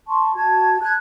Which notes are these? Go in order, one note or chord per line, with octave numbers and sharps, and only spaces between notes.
A5 C6 C#6
F#4 A5 G#6
A5 F#6 G#6